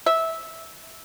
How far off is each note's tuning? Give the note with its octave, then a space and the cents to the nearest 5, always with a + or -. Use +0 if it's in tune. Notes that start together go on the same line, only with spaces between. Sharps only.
E5 -15